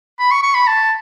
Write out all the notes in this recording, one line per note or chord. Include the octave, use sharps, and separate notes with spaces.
B5
C#6
C#6
B5
A5